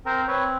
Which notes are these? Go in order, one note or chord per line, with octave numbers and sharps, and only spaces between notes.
C4 A#4 C5
C4 B4 C#5